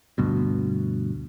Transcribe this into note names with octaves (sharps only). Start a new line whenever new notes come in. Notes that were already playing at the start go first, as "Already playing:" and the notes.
D2 G2 B2